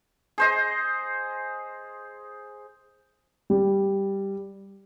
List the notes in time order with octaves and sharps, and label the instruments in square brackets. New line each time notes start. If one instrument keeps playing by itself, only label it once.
[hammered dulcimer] G#4 C5 D#5
[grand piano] G3